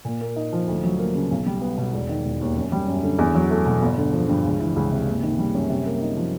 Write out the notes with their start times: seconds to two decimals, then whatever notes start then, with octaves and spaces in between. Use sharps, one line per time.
0.05 A#2
0.21 A#3
0.36 D#4
0.53 F3
0.67 D2
0.84 F#3
0.99 A#3
1.15 C#3
1.31 B1
1.46 G3
1.61 B3
1.78 B2
1.93 E1
2.09 D#3
2.25 E1
2.41 D#2
2.57 F#2
2.72 G3
2.88 F#2
3.03 D3
3.18 E2
3.35 F#3
3.50 A3
3.66 B2
3.82 G1
3.97 D3
4.13 F3
4.28 G2
4.45 C#2
4.60 E3
4.76 C#2
4.92 C3
5.07 F#1
5.23 D#3
5.39 G3
5.55 F#2
5.69 C3
5.86 A#3
6.01 D#4
6.17 F3